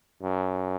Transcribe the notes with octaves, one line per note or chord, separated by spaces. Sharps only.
F#2